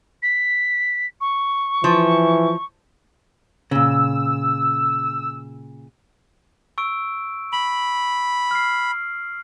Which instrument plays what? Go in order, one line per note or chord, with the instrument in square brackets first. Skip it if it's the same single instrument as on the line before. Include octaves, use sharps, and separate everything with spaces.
[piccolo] B6
C#6
[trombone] E3 [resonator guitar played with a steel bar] F3
[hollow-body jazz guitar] A#2 C#3 [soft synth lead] E6
[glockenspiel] C#6 E6 D7
[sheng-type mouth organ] B5 [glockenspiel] F#7
[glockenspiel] F6 C7